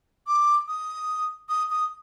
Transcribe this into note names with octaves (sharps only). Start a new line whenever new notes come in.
D6
D#6
D#6
D#6